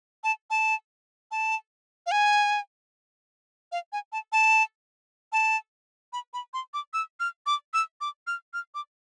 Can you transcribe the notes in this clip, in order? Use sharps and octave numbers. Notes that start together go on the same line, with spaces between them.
A5
A5
A5
F5
G#5
F5
G#5
A5
A5
A5
B5
B5
C6
D6
E6
F6
D6
E6
D6
F6
F6
D6